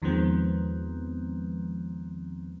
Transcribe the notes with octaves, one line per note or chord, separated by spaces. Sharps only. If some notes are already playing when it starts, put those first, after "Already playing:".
E2 D#3 F3 G#3 B3 C4